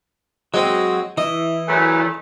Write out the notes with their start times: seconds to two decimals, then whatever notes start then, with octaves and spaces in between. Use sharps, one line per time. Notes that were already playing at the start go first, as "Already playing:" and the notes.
0.54 F#3 G#3 C4 F#4 D#5
1.17 E3 E4 D#5 E5
1.68 A#2 C#3 F#3 A3 B4 G#5